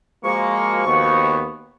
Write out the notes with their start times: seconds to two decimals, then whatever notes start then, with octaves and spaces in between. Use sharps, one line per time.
0.24 F3 G#3 A#3 F#4 C#6
0.86 D#2 B3